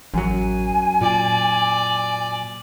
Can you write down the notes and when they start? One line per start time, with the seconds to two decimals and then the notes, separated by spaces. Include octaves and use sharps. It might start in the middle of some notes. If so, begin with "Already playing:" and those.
0.14 A1 F#2 F#3 G#5
1.01 A#2 D5